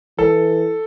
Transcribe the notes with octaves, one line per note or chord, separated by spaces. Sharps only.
E3 A4